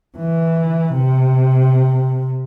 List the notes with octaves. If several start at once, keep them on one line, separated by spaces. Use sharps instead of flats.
E3
C3